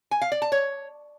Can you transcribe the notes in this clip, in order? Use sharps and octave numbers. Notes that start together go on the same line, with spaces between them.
G#5
F5
D5
A5
C#5